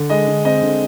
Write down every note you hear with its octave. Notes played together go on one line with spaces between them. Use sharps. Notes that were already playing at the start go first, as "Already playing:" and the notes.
Already playing: D3
G#3 D#5
D3
C4 D#5
D3